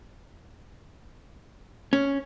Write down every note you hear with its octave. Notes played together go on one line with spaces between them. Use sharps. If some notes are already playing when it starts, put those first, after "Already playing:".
C#4